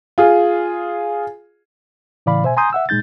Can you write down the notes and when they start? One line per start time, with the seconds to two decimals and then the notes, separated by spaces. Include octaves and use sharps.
0.18 F4 G#4
2.26 A2 C#3 E3 D5 F5 B5
2.43 B2 C5 E5 G#5
2.57 G#5 A#5 C6 D#6 G6
2.73 E5 F#5 E6
2.89 A#2 G#3 D#4 G6 A6